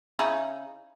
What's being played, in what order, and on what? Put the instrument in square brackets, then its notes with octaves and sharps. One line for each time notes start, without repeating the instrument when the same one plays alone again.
[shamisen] C#3 D#4 E4